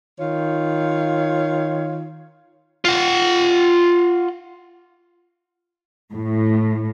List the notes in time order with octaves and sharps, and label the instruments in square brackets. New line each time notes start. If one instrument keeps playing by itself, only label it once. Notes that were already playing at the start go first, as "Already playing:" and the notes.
[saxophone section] D#3 F4 C#5
[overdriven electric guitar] F4 F#5
[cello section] A2